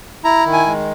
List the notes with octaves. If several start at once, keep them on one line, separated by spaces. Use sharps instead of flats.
E4 A#5
D#3
G#5
G#3